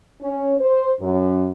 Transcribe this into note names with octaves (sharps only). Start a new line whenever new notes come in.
C#4
C5
F#2